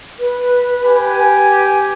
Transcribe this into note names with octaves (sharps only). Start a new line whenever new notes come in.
B4
G4 G#5